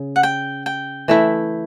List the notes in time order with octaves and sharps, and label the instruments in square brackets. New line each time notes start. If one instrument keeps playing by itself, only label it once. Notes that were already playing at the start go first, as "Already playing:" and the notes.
Already playing: [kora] C#3
[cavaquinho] F#5
G5
G5
[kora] E3 A3 E4